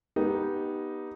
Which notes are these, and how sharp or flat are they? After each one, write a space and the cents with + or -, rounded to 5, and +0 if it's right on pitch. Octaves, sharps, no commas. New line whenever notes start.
B3 -15 D#4 +0 G4 +0